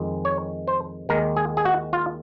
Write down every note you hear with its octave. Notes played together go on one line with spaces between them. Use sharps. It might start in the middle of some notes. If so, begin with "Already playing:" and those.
Already playing: F2 D#3 G#3
C#5
C5
D#2 D#3 G#3 A#4
G#4
G#4
F#4
F4